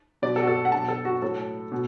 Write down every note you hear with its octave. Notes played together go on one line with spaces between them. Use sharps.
B2 F#3 D5
A4
F#4
A4
F#5
B2 F#3 A5
A4
F#4
A2 F#3 A4
B2